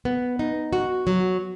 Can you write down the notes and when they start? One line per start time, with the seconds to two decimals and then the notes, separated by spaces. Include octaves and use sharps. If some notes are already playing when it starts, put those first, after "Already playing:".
0.05 B3
0.39 D#4
0.73 F#4
1.07 F#3